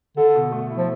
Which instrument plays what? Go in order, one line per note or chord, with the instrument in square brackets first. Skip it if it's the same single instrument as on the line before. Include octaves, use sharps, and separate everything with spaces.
[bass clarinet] D3 [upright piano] A4
[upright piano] B2
A3
E4
[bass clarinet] F3